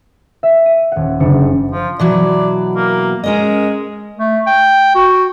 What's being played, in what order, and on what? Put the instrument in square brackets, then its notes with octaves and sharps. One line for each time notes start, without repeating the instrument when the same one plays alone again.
[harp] E5
D#7
D#1 F#5
F#1 D3 D4 C#7
G3
[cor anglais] F3
[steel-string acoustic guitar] B2 E3 F#3 [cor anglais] D5
[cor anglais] A#3
[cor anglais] G#3 [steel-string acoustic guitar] C#4 A#4 D#5
[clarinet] A3
G5
F#4